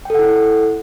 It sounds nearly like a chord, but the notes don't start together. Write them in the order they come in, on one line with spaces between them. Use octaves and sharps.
G5 A4 F#5 E4